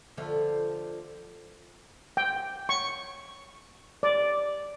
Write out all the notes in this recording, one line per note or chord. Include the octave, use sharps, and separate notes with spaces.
D3 F3 A3
G5
C#6
D5